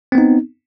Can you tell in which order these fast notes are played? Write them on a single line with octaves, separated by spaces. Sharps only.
C4 B3 D#4